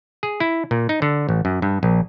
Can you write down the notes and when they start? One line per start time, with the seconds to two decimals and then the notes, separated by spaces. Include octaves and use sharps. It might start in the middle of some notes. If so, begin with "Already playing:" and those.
0.23 G#4
0.40 E4
0.71 A#2
0.89 D#4
1.02 D3
1.29 A1
1.45 F#2
1.62 G2
1.83 A#1